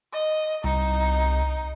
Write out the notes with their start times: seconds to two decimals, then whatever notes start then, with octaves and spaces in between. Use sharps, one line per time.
0.13 D#5
0.64 C2 D#4